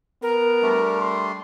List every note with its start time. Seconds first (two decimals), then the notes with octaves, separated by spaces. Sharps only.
0.22 B3 A#4
0.63 G3 A3 D4
1.00 C6